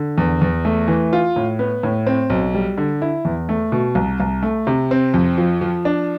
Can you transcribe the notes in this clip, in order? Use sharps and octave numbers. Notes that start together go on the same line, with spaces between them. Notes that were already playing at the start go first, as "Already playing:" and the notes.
Already playing: D3
E2
E2
A3
E3
F4
A2
B3
A2
C4
B1
G3
D3
E4
E2
A3
B2
C2
C2
A3
C3
C4
F2
F3
F3
D4